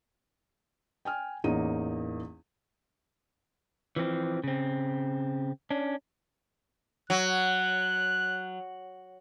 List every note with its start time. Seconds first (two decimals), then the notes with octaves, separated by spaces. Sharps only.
1.05 G5 G#5 F6
1.44 A1 E2 A#3 D#4 D#7
3.96 E3 F3 C4
4.44 C#3 C4
5.71 C#4 D4
7.10 F#3 F#6